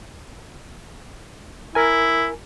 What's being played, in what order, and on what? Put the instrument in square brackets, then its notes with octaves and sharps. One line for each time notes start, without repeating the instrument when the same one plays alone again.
[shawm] E4 [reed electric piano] A#4 G#5